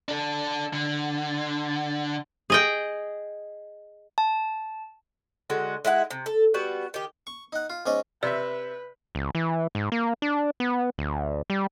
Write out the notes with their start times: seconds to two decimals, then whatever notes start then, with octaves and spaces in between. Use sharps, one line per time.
0.09 D4 A4
0.73 D3
2.50 G#4 D#5 G5
4.18 A5
5.50 D3 G#3 F#4
5.85 G#3 E4 E5 F#5
6.11 C3
6.26 A4
6.54 G3 B3 F#4
6.94 D#3 G4
7.27 C#6
7.53 D#4 F#5
7.70 F4
7.86 G#2 C#4 D5 D#5
8.23 C3 B4 D5 E5
9.15 C#2
9.35 E3
9.75 G#2
9.92 A#3
10.22 D4
10.60 B3
10.98 D2
11.50 G3